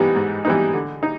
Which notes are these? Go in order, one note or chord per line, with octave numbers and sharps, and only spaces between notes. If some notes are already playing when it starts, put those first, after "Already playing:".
Already playing: G#2 E3 G3 B3 D#4
G#2
E3 G3 B3 D#4
D3
D#4